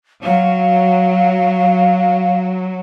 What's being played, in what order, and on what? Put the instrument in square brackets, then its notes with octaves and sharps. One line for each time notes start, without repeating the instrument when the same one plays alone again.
[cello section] F#3 [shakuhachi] F5